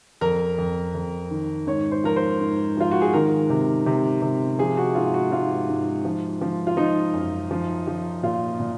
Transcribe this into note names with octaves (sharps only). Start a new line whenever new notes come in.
F2 A#4
F2
F2
D#3
G#2 C#5
C5
F3 A#4
C5
G#2
F3 F4
F#4
G#4
D#3 A#4
C3
C3
C3
F3 G#4
F#4
G#2 F4
F#4
G#2 F4
G#2
F3
F3
F4
F3 D#4
F#2
F3
F3
A#2 F4
A#2